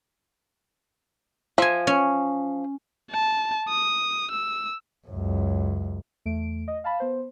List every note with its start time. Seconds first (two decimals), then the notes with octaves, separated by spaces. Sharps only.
1.58 F3 E5 G#5
1.87 C#4
3.11 A5
3.69 D#6
4.31 E6
5.07 C#2 F#2
6.25 E2 A3 D7
6.68 D#5
6.84 F5 A5 B5
7.00 B3 C5